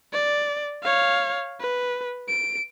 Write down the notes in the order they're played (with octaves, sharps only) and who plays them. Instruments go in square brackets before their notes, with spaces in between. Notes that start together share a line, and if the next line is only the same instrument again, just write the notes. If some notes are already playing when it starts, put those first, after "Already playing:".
[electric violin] D5
C#5 F5
B4
D7